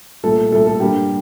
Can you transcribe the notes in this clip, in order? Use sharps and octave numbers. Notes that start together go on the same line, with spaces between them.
C2 A#2 A3 A4
C2 A#2 A3 A4
A4
G2 D3 G3 A#3 G4